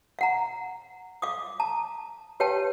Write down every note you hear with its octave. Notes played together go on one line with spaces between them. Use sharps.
F5 F#5 A#5
F5 D6 D#6
A5 A#5
G4 B4 C#5 F5 G5 A5